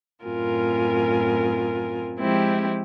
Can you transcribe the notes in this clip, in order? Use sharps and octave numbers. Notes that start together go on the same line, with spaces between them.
F#2 A2 C4 F4 A#4 G#5
F3 G#3 C4 E4 G4